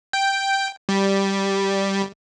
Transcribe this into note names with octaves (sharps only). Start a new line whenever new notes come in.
G5
G3